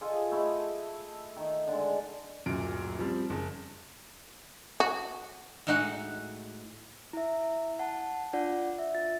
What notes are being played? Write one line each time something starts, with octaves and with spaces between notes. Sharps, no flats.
F4 G#4 A4 D#5
A3 E4 D#5
D#3
D3 G#3
D1 F#2 A#2 D7
F3 G3 C4
F#1
F#4
A2 G#3 D#4 F#4 F#5
E4 E5
F#5 A5
D4 F4 D5 F#5
E5
F4 A6